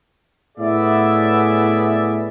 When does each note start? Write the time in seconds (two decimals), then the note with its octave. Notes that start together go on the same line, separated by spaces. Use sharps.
0.58 A2 B3 G#4 D5 E5